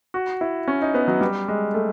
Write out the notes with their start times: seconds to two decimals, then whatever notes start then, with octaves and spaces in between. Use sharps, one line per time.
0.14 F#4
0.41 E4
0.68 C#4
0.82 D#4
0.94 B3
1.08 F#3
1.21 G3
1.48 G#3
1.74 A3